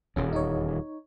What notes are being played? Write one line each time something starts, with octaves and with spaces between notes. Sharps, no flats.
D#1 E2 C#4
D#4 C#5